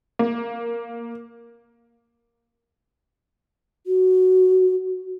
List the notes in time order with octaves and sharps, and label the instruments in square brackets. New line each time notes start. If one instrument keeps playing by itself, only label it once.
[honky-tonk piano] A#3
[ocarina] F#4